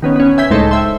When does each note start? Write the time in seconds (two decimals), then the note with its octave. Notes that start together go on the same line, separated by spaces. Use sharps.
0.02 D#3 B3 C#4
0.16 B3 C#4
0.38 E5 G#5 G6 B6
0.50 C#2 A2 G#3 D#4 A4 C5
0.71 C5 E5 G5